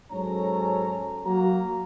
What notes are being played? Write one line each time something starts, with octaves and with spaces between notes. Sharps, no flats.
G#2 F#3 C#4 A4 C#5 A#5
F#3 A#3 F#4 A#5